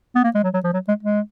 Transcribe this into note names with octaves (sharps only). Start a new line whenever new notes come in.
B3
A#3
G#3
F#3
F#3
F3
F#3
G#3
G#3